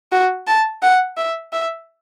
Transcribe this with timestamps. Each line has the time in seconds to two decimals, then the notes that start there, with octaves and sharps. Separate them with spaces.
0.12 F#4
0.47 A5
0.82 F#5
1.17 E5
1.53 E5